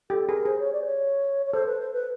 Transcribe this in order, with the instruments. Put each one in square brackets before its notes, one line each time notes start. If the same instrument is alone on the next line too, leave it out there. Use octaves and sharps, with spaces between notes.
[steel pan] G4 [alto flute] A4
[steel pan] G#4 [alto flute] A#4
[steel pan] G#4 [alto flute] C5
[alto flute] C#5
D5
C5
C#5
C#5
[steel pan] A4 [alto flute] C5
[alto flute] B4
C5
B4